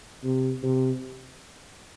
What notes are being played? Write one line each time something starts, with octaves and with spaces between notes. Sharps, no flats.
C3
C3